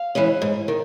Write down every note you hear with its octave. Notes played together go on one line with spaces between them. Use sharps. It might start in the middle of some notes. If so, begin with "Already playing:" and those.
Already playing: F5
E3 G#3 C#4
G#2
D#3